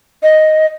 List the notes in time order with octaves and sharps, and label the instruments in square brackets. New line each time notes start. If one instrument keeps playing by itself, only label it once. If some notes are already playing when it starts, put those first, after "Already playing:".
[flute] D#5